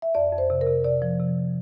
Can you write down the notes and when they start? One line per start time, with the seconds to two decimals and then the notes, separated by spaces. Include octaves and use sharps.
0.02 E5
0.15 F2 D5
0.33 F2
0.38 C5
0.50 C3
0.61 A#4
0.67 C3
0.84 C3 D5
1.02 F3
1.19 C3